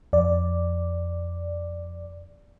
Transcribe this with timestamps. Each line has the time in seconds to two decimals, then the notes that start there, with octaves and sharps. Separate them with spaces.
0.13 F2 D5